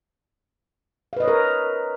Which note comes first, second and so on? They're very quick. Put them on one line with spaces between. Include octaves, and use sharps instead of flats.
F5 B4 D#5 C#5 A#4